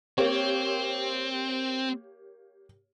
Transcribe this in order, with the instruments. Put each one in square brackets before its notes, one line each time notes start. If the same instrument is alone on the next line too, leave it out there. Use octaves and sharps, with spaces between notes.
[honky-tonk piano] A#3 G4 C#5 [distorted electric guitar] C4